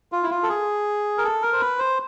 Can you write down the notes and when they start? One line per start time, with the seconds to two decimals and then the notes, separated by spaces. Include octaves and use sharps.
0.12 F4
0.23 E4
0.31 F4
0.43 A4
0.49 G#4
1.18 A#4
1.24 A4
1.42 A#4
1.53 C5
1.61 B4
1.79 C5